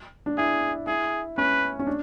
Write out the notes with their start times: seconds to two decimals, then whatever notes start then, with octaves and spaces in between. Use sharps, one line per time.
0.26 D4
0.37 E4 G#4
0.87 E4 G#4
1.38 C#4 B4
1.79 C#4
1.87 D4